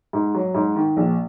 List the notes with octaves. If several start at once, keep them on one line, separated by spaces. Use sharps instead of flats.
G#2
F#3
G#2
D#3
A#1